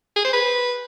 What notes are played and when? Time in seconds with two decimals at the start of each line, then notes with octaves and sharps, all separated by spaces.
0.16 G#4
0.25 C5
0.33 B4